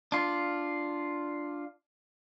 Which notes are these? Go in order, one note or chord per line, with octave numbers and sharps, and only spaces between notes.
D4 F4